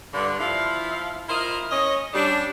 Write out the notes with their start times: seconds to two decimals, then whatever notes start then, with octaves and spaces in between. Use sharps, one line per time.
0.14 G2 D3
0.40 F3 E4 F5
1.29 E4 F4 A#4 C5 D#5
1.71 C#4 D#5
2.14 G3 C#4 D4